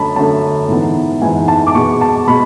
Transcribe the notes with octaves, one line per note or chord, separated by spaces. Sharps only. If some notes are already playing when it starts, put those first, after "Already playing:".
Already playing: F#2 D3 A3 A5 B5
F#2 D3 A3 A5
G#2 E3 B3
G#2 E3 B3 G#5
A5
D6
B2 G#3 B3 C#6
A5
B2 G#3 B5